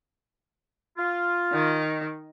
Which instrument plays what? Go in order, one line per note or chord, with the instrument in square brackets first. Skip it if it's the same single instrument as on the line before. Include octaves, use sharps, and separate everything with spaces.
[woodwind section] F4
[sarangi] D#3